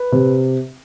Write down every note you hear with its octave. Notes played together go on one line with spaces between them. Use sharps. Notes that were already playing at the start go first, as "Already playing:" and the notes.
Already playing: B4
C3